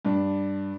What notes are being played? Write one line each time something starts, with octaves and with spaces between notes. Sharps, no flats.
G2 D4